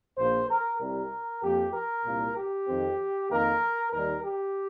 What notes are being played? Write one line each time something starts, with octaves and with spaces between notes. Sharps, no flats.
A#1 A#2 A#3 C5
A#4
C2 C3 G3 A#4
F2 F3 A#3 G4
A#4
C2 A#2 A#3
G4
F2 D#3 C4
F2 D#3 A#3 A#4
D#2 D#3 G3 A#4
G4